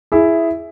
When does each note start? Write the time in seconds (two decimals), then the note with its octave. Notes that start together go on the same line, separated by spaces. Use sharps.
0.12 E4 G#4